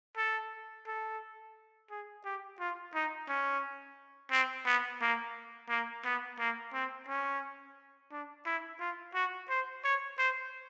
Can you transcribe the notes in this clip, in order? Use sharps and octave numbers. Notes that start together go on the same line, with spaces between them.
A4
A4
G#4
G4
F4
D#4
C#4
C4
B3
A#3
A#3
B3
A#3
C4
C#4
D4
E4
F4
F#4
C5
C#5
C5